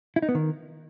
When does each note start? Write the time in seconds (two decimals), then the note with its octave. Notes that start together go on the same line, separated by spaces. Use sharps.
0.16 E4
0.22 D#4
0.29 B3
0.35 D#3